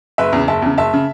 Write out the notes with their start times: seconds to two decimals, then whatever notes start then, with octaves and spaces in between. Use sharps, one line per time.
0.18 F#1 B4 E5
0.33 E2 C#3
0.48 F#1 E5 A5
0.62 E2 C#3
0.78 F#1 E5 A5
0.94 C#3